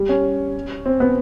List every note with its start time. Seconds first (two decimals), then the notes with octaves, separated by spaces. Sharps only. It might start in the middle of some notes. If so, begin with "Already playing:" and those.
Already playing: G3
0.09 C#4
0.86 C4
1.00 B3